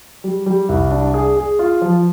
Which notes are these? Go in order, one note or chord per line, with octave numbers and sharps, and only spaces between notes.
G3
G3
C2
D4
G#4
G#4
F4
F3